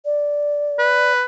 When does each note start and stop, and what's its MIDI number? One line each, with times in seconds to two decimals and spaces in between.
0.05 1.12 74
0.79 1.25 71